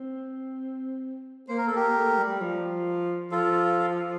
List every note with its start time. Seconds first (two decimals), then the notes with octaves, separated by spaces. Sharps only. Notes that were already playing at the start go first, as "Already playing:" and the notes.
Already playing: C4
1.48 A#3 C5
1.58 A#4
1.67 A4
1.72 A#3 G4 A#4
1.95 A3
2.18 G3
2.41 F3
3.31 F3 F4 A4